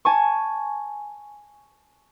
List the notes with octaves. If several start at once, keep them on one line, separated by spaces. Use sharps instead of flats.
G#5 A5 C#6